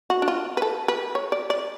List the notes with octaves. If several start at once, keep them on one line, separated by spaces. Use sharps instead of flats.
F#4
D4
F4
B4
A4
B4
C#5
D5
D5